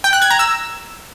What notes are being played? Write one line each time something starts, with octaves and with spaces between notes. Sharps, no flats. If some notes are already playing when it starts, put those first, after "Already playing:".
G5
F#6
G#6
A#5
E6